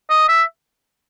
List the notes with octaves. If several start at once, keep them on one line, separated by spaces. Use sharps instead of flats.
D#5
E5